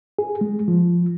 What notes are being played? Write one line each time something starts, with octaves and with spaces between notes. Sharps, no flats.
G#4
G#3
F3